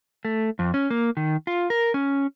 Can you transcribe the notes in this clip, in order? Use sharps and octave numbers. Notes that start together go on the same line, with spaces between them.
A3
F2
C#4
A#3
D#3
F4
A#4
C#4